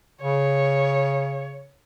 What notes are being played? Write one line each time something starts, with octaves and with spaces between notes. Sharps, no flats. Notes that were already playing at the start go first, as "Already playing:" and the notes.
C#3 C#5